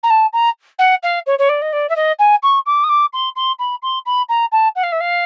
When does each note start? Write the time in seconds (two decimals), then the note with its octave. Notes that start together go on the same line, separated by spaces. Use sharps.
0.03 A#5
0.10 A5
0.33 A#5
0.79 F#5
1.03 F5
1.26 C#5
1.39 C#5
1.49 D5
1.61 D#5
1.73 D5
1.89 E5
1.96 D#5
2.19 G#5
2.43 C#6
2.66 D6
2.84 D#6
2.89 D6
3.13 C6
3.36 C6
3.59 B5
3.82 C6
4.06 B5
4.29 A#5
4.52 A5
4.75 F#5
4.83 F5
4.92 E5
5.00 F5